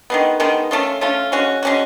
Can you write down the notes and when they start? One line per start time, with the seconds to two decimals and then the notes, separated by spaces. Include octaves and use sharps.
0.10 D#3 G#3 B3
0.40 D#3 G#3 B3
0.71 A3 C#4 F4
1.01 A3 C#4 F4
1.32 G#3 C#4 F#4
1.63 G#3 C#4 F#4